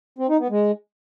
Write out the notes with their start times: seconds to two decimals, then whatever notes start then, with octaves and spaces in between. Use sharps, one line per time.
0.19 C4
0.29 D#4
0.40 B3
0.50 G#3